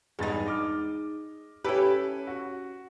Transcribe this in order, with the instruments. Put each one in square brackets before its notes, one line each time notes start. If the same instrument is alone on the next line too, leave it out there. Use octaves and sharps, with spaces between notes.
[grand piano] E2 G2 A6 [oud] G#3 D#4
[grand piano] D#5 D6 F6
[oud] C#4 G4 [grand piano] E4 A4 B4
[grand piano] F#4